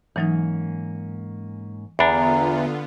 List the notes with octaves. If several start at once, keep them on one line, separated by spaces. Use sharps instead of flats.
G#2 E3 F#3 A#3 C#4 D#4
E2 D3 B3 D4 F4 G5 A#5 B5